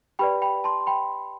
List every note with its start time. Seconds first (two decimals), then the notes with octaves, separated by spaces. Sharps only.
0.19 G4 B4 D5 G5 B5
0.42 G5 B5
0.64 A5 C6
0.87 G5 B5